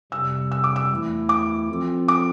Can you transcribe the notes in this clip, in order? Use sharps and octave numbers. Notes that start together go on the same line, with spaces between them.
F2 C3 G3 E6
E6
D6
E6
E2 E3 A3 E4
D6
F3 C4 F4 A4
D6